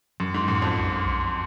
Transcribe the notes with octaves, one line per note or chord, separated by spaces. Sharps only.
F#2 F#3
G#2
F#2 A2
F2
B1
B1